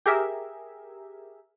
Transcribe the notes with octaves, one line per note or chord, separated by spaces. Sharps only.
G4 G#4 A#4 E5